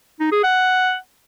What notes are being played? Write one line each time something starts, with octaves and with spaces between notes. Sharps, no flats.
D#4
G#4
F#5